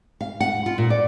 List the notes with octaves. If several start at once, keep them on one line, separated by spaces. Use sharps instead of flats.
F5
F#5
F4
A#2
D5